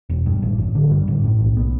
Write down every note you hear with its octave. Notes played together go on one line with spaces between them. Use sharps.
E1
G2
A1
A1
D3
G2
A1
A2
B1
B3